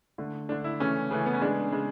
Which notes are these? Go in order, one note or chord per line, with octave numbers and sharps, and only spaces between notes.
D3 A3
D3 A3 D4
E4
C#3 E3 A3 C#4
C#3 E3 A3
B3
C#4
C#3 G#3 D4
C#3 G#3